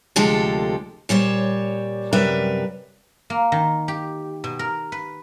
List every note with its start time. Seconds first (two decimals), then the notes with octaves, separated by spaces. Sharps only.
0.16 D2 C3 F3 G#3 G4 A4
1.09 A#2 G3 C5 C#5
2.13 F#2 C3 G3 A#4 B4 E5
3.30 A#3
3.52 D#3
3.88 G4
4.44 B2
4.59 A#4
4.92 B4